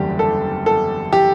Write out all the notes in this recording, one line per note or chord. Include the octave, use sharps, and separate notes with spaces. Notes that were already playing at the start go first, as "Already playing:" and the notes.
Already playing: F#1 E2 D3 G3 D4 G4
A4
A4
G4